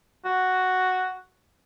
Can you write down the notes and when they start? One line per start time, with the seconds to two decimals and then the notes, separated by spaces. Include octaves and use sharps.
0.25 F#4